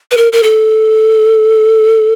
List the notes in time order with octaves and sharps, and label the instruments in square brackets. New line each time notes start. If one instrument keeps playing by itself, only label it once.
[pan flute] B4
A#4
A#4
A4